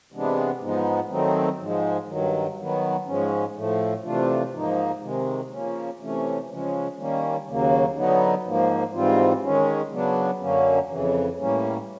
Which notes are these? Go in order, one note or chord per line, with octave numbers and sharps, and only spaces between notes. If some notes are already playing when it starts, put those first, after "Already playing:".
C3 E3 G#3 B3 D4
G#2 F3 G#3 B3 D#4
D#3 F#3 A3 C4 D#4
G#2 F3 G#3
G2 D#3 F#3
D#3 F#3 B3
G#2 F3 G#3 C#4
A2 F3 A3
C3 E3 A3 D4 F4
G#2 F3 A#3 D#4
C3 D#3 G#3
C#3 F3 A#3 C#4
C3 E3 A3 C#4
C#3 F3 G#3 C#4
D#3 G3 A#3 C#4
D#2 C#3 F#3 A#3
D3 F#3 B3 D#4
G#2 F3 A#3
G#2 E3 G3 C4 F4
D#3 G#3 C#4
C#3 F#3 B3 D4
F#2 D3 F#3 A#3 C#4
F2 C#3 E3
A2 E3 G3 A#3 C#4